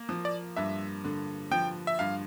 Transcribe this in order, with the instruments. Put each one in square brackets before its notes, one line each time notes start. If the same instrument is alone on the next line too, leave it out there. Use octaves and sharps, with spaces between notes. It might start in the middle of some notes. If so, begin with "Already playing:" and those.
Already playing: [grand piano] A#3
F3
[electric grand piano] D5
[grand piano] G2 [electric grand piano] E5
[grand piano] D3
[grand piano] F3 [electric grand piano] G5
[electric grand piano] E5
[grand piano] G2 [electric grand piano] F5